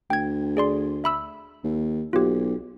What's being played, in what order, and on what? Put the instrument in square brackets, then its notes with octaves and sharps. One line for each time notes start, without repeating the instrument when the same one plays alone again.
[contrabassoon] D2 [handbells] G5 G#6
[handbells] G#4 D5 C6
E5 B5 E6
[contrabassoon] D#2
[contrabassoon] B1 [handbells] F4 G4